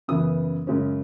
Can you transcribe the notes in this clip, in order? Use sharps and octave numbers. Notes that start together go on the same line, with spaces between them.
F#2 C#3 E3 B3 D#6
F#2 C#3 G#3 C#4